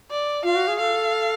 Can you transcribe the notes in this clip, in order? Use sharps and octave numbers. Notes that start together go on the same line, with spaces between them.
D5
F4 F5
F#4
G#4
A4 F5